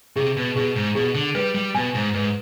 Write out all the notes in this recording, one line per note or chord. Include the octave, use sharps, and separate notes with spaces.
C3 G#4
B2
B2 G#4
G#2
B2 G#4
D3
G3 B4
G3
B2 G#5
G#2
G#2 B4